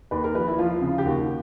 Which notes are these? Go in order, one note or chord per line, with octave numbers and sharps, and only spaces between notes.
D#2 B4
A#4
F3 B4
E4
F3 F4
C#3
G4
D#2 F#4